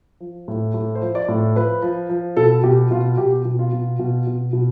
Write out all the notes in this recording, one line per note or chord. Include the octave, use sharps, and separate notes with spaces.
F3
A2
A2
C5
F3
D5
A2
F3 B4
F3
F3
B2 A4
B2 G4
B2 F4
B2 G4
B2
F4
B2
B2
B2
B2